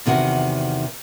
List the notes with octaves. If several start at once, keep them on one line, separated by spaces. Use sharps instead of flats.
E2 C3 D#3 F#4